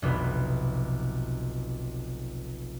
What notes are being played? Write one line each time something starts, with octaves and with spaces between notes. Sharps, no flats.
F1 B1 B2 B3